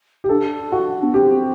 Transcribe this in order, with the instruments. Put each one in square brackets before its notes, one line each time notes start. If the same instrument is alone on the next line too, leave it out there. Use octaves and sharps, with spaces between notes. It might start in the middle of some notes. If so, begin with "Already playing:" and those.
[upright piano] G4
[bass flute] D4 [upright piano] A4
[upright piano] F#4
[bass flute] B3
[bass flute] C4 [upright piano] G4